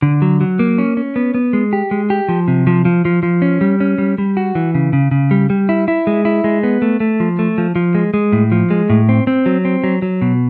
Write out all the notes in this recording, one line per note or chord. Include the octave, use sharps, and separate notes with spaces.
D3
F#3
F#3
A#3
C#4
C#4
B3
B3
G#3
G4
G#3
G4
F3
C3
F3
F3
F3
F3
C#4
G3
C#4
G3
G3
F#4
E3
C#3
C#3
C#3
G3
G3
E4
E4
G#3
E4
G#3
B3
A3
A3
F3
A3
F3
F3
G#3
G#3
A2
F3
G#3
A2
C4
C4
F#3
C4
F#3
F#3
B2